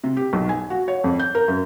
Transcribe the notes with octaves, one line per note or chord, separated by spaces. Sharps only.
C3
G4
B1
G#5
F#4
C#5
F2
G6
A#4
F#2